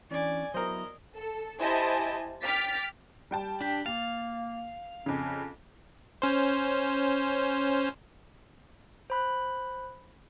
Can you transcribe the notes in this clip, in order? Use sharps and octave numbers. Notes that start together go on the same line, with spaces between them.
E3 C#4 D4 D5 G#5
F#3 B3 E4 A#4 C5 D#5
A4
E4 G4 C5 D#5 G#5 A5
G5 D6 F6 A6 B6
G3 G5 A5
D4 G4
A#3 F5 A6
F2 C#3 C#4
C#4 C5
C5 B5 F#6